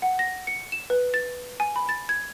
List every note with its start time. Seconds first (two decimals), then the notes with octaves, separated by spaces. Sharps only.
0.02 F#5
0.19 A#6
0.47 C#7
0.72 E7
0.90 B4
1.14 A6
1.60 G#5
1.76 B5
1.89 A6
2.09 G#6